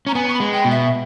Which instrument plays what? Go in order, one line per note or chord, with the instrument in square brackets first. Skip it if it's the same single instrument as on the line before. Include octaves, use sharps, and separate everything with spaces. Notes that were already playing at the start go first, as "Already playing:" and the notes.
[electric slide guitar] C#4 [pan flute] A#5
[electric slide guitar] B3 [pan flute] G#5
[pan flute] C#6
B5
[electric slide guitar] G#3
[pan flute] G5
[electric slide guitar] B2
[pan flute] E5